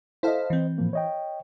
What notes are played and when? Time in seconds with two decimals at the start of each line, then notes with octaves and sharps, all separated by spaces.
0.23 E4 A4 C5 D#5 F5
0.50 E3 C4
0.78 A2 F3 A#3
0.93 C#5 D#5 G5